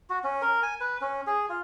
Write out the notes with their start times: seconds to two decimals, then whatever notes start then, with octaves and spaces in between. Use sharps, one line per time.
0.10 F#4
0.24 C#4
0.42 A#4
0.63 G#5
0.80 B4
1.01 C#4
1.27 G#4
1.49 F4